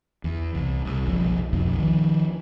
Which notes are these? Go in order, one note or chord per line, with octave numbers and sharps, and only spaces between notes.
E2
C2
C2
F#1 B1 F3
B1 F2 B2
D#3 F3